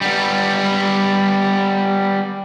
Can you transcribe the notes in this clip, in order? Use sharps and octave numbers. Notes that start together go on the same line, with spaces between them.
G3 B3